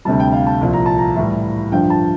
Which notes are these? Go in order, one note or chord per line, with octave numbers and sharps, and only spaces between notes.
D2 C3 G3 A5
G5
F5
A5
C2 A#2 F3
A#5
A5
A#5
A2 E3 G3
G2 D3 F3 G5
A5